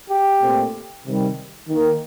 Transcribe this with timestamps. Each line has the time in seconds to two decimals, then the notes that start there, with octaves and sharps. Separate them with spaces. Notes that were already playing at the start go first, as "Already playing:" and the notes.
0.09 G4
0.41 A#2 A3 C4
1.06 C3 D#3 G3
1.69 D#3 A#3